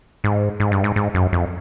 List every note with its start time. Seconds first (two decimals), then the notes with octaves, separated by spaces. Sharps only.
0.24 G#2
0.60 G#2
0.72 G2
0.84 G#2
0.96 G#2
1.14 F#2
1.33 F2